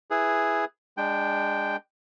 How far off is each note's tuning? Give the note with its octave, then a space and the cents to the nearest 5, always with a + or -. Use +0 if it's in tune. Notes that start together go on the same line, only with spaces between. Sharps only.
E4 +0 G#4 +0 B4 +0
G#3 -25 D4 +0 G5 +0